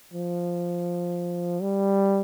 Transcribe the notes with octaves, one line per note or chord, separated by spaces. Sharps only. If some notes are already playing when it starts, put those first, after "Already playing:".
F3
G3